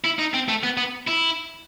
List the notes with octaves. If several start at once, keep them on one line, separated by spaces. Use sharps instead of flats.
E4
D#4
C4
A3
B3
B3
E4